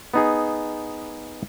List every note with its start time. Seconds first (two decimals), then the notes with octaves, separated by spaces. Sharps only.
0.14 B3 D#4 G#4